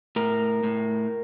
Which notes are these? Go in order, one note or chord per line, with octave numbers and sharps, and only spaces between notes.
A2 A#4
A2